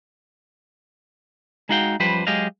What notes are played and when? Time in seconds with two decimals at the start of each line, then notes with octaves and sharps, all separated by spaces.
1.69 G#3 D#4 F#4 F5 G5
2.00 F#2 F3 G3 G4 B4 C5
2.27 F#3 G#3 G4 G#4 D#5 F5